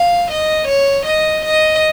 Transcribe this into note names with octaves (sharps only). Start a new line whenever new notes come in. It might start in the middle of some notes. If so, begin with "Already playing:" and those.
Already playing: F5
D#5
C#5
D#5
D#5